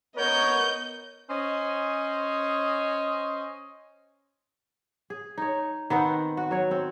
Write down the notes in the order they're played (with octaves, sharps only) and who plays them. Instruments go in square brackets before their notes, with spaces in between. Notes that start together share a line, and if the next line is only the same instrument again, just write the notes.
[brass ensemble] B3 A#4 C#5 [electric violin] D#5 G6
[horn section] C#4 C5 C#5 D#5
[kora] G#4
D#4 C#5
D#3 B3 C4 F#5
F#4
F#3 C#5
C4